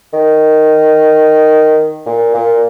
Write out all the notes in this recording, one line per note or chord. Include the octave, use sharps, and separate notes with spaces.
D#3
A#2
A#2